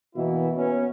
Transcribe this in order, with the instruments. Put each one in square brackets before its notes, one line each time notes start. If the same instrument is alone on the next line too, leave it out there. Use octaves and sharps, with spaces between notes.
[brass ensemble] B2 E3 A#3 E4
B3 C#4